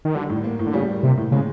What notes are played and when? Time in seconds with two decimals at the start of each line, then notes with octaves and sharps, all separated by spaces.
0.05 D#3
0.15 D3 G3
0.30 A2
0.44 A#3
0.59 A2
0.67 D3
0.73 C#3 G3
0.88 A#3
1.03 C3 A#3
1.17 A2
1.32 C#3 G#3